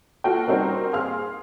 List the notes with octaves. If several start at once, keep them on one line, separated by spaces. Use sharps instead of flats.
F4 F#4 A4 G5
G3 C4 D#4 F#4 A#4
G#4 F5 C6 F6